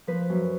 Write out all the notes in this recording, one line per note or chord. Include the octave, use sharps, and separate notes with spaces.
F3 B4
F#2